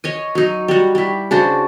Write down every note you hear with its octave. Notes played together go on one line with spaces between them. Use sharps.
C#5 D#5 G#5
F#3 D#4
G3 F#4
G3 E4
C#3 D4 F#4 C5